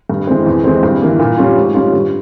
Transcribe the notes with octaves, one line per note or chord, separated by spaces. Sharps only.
G2
E3 G#3 C4
E2
E3 G#3 C4
G2
E3 A#3
A#2
G3 C#4 F4
G#2
G3 C#4 F4
G2